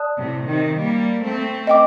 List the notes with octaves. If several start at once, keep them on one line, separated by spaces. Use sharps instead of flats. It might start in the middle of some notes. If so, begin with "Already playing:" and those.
Already playing: D5 A5 D#6 F#6
A2 C3
C3 D#3
G3 A#3
A3 C4
D#5 G5 D6